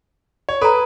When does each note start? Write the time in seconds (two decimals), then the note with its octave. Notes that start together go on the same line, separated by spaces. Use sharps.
0.49 C#5
0.62 A4 B4 A#5